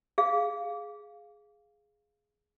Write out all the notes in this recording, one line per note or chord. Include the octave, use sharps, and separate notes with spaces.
G#4 F5